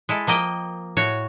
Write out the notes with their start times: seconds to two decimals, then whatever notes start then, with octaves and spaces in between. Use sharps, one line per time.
0.09 G#3 E4 A4
0.27 F3 A#3 D#5 G5
0.97 A2 F#4 C#5